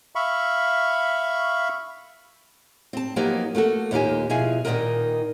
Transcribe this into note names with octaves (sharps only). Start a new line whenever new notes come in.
E5 F5 B5 C#6
C4 A5
F3 F#3 A#3 B3 D#4 G4
A3 A#3 F#4 A4
D#2 A#2 A#3 D#4 G4 G#5
B2 F3 E4 G#4 F5 G#5
A#2 D#3 E3 B3 D#4 A#4